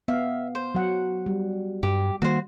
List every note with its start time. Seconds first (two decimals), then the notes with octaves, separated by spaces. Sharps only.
0.08 B3 E5 F5
0.55 C5
0.75 F#3 F#5
1.26 G3
1.83 G2 G4
2.22 D#3 G3 A#3 F#4 C5